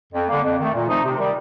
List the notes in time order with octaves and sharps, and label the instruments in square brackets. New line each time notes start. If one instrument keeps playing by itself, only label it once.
[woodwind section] F2
D3 G3 A#3
F2
D#3 A3
A#2
F3 A3 C4 D#4
C3
D#3 G3